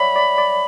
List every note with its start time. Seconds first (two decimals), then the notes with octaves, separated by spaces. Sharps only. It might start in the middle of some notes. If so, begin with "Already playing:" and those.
Already playing: C#5 D5 E5 F#5 B5
0.16 D5
0.38 D5